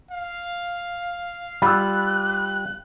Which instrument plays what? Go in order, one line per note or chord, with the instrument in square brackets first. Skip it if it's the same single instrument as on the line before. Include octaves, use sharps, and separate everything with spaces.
[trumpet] F5
[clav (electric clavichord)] G3 F4 [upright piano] B5 E6 [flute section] F#6